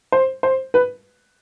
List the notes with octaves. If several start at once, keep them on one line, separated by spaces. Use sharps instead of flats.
C5
C5
B4